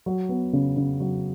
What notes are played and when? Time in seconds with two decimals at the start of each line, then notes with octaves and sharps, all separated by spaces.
0.06 F#3
0.29 B3
0.53 C#3
0.77 C#3
1.00 F#3